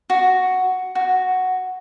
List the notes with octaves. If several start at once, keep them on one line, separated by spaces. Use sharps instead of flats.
F#4
F#4